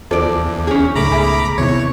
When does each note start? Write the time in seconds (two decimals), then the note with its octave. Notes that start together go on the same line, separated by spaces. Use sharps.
0.11 E2 F4 A4 C5 D5
0.67 C#4 G#4
0.96 C#2 G#2 A3 A#5 B5 D6
1.12 B2 G#4 E5 G#5
1.58 E2 C3 E3 C#5